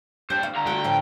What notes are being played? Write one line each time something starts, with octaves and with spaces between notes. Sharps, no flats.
D#2 D4 G4 C5
F5
D3 A#5
A3 F#4 G5
A2 F3